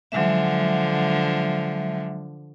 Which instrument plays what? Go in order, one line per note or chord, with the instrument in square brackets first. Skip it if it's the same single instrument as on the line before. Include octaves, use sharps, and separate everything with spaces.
[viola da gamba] D3 F3 [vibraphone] F#3 G#3 E5